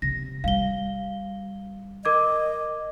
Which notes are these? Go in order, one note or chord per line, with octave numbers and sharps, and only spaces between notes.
C3 A#6
G3 F5 G7
A#4 D#5 D6 G#6